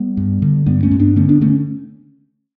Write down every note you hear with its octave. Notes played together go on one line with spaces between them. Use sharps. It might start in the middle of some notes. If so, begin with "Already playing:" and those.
Already playing: G3 B3
G2
D3
G2 G3 B3
A3 C#4
G2
B3 D4
D3 A3 C#4
B3 D4
D3 A3 C#4